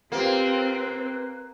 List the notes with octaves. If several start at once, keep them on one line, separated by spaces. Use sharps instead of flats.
A#3 C4 F4 G4 B4